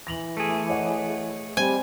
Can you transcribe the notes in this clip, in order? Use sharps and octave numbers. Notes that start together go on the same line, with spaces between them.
E3 A#6 F7 F#7
A3 G#4
C#5 D#5 F#5
G3 C4 G#5